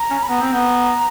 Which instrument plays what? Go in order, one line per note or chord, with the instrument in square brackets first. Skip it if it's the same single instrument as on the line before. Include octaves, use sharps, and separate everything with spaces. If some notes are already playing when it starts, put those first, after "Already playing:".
Already playing: [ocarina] A#5
[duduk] C#4
[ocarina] B5
[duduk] B3 [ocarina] A#5
[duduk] C4
B3